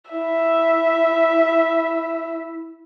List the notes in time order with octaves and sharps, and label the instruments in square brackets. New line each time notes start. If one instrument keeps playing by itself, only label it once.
[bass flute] E4 [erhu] E5